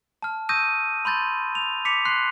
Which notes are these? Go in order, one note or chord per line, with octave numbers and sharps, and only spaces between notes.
A5 F6
C#6 D#6 E6 G6 A#6 D#7
B5 C6 G6 A6
F7
D6 B6 C#7 F7
C6 F#6 C7